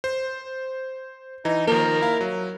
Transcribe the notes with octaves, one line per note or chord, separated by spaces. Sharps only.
C5
E3 D#4
D#3 F3 A#3 A#4
E4 F5 B5
F#3